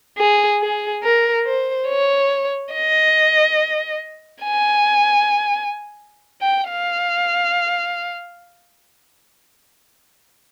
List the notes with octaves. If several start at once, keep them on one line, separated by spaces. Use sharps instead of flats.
G#4
G#4
A#4
C5
C#5
D#5
G#5
G5
F5